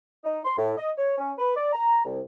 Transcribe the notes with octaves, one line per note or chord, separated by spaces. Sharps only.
D#4
C6
A2
D#5
C#5
C#4
B4
D5
A#5
C2